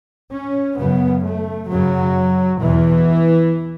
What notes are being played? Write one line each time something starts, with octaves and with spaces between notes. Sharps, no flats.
C#4
F#2 C#3 B3
A3
F#2 C#3 F#3
E2 B2 E3